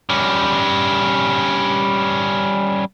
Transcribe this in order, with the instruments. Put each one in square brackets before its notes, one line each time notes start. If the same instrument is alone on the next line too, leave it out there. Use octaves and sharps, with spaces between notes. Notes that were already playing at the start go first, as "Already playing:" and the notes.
[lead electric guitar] G3 C#4